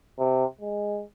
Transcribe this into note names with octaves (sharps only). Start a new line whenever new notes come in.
C3
G#3